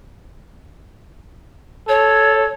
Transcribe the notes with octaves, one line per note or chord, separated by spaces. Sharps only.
A4 C#5